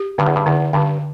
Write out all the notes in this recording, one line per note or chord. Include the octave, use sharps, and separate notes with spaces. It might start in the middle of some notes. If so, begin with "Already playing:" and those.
Already playing: G4
G2 D3
E2
G2
E2 D3
G2 D3